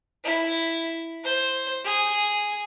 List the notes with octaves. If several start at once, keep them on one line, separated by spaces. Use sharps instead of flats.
E4
C5
G#4